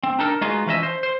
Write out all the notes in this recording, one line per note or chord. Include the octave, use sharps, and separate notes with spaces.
C4
D4 D#4 A4 A#4
G#3 B3 D#4 F4 F#4 G#4
E3 F3 C#4 B4 D#5 E5
C5
C5